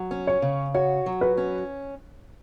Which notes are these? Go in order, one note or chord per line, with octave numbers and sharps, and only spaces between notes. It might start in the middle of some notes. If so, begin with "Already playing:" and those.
Already playing: F#3
C#4
C#5
C#3
F#4 C#5
F#3
B4
C#4